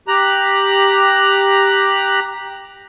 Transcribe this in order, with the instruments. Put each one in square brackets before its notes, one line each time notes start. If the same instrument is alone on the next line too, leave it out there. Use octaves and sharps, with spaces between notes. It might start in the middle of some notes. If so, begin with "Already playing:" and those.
[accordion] G4 A#5 F#6